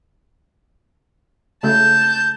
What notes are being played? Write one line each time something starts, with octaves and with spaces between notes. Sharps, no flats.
C#3 A3 A5 G6